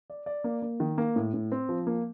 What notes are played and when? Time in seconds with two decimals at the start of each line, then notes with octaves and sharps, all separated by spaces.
0.10 D5
0.26 D5
0.44 A#3
0.62 A#3
0.80 D#3
0.98 A#3
1.16 A2
1.34 A2
1.52 C4
1.69 F3
1.87 A#3